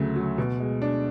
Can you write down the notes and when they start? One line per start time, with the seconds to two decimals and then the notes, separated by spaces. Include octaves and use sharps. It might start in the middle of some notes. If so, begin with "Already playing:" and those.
Already playing: D2 C#3 F#3 A3
0.16 F#3
0.38 B2
0.59 G#3
0.82 D4